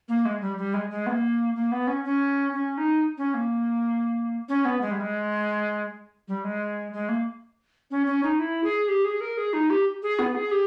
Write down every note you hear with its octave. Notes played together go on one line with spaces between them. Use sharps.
A#3
G#3
G3
G3
G#3
G#3
B3
A#3
A#3
B3
C#4
C#4
C#4
D#4
C#4
A#3
C#4
B3
G#3
G3
G#3
G3
G#3
G#3
A#3
C#4
C#4
D#4
E4
G#4
G4
G#4
A#4
G#4
D#4
G4
G#4
B3
G#4
G4